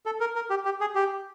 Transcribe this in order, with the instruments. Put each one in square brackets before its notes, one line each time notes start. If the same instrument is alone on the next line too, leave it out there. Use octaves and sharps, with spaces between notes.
[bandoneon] A4
A#4
A#4
G4
G4
G#4
G4